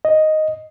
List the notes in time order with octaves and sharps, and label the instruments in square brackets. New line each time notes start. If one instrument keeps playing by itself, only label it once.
[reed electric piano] D#5